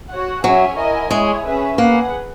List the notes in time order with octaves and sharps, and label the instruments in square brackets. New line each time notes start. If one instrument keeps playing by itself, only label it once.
[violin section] F#4 C#5 F#5
[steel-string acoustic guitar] F#3 [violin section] C#4 G#4 C#5 E5 G#5
[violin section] E4 A#4 D#5 G#5
[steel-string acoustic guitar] G#3 [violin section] E4 G#4 C#5
[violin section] C#4 G#4 B4 E5
[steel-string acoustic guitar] A#3 [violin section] G#4 B4 F#5